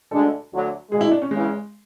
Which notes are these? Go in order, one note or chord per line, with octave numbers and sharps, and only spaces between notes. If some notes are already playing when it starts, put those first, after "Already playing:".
D2 D3 G#3 D4 A4
D2 D3 F#3
D2 D3 G#3 G#4
E4
D4
C#4
E2 C#3 E3 G#3